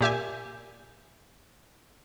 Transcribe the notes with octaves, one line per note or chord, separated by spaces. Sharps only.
A#2 G4 E5 G#5